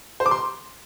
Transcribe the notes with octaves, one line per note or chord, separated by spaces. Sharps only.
C5
D6
C6